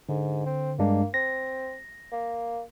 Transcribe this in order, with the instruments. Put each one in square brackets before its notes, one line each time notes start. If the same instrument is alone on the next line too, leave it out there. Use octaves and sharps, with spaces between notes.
[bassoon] G#2 [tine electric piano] D3
[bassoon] C4
[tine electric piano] G2 G#3 D4 [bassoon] A#3
[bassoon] C4 [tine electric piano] A#6
[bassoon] A#3